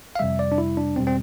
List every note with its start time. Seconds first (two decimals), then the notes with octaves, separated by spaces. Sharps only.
0.15 F5
0.19 F2 C3 G3 E5
0.39 D5
0.52 D4
0.58 E4
0.77 D4
0.96 E2 B2 G3 C4
1.07 C4